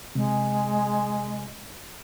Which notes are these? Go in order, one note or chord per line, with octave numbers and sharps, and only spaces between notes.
C3 G#3